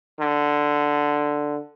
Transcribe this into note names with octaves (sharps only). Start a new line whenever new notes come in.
D3